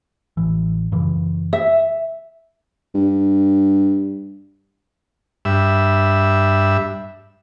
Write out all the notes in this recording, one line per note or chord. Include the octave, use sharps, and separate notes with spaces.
A1 E3
F#2 C#3 E3
E5
G2
G2 E5